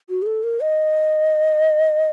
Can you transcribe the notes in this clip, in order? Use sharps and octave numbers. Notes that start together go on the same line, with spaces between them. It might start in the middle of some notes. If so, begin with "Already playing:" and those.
F#4
G#4
A4
A#4
D#5